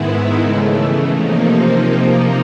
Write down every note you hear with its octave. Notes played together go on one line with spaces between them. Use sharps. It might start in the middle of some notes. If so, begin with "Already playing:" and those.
Already playing: G#2 D#3 G#3 B3 E4
C#3 E3 A3
C3 F3 A#3 D#4